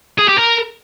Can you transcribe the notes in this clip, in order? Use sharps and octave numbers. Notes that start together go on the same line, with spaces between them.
G#4
G4
A#4